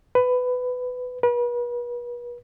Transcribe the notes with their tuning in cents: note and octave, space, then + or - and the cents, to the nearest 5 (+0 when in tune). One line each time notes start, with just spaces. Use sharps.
B4 +15
B4 -40